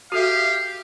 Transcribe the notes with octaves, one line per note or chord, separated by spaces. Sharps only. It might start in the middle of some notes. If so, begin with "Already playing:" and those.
F#4 G4 A4 E5 F5